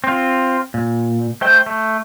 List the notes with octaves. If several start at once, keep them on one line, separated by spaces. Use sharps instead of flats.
C4 F4
A#2
A3 C5 G5
A3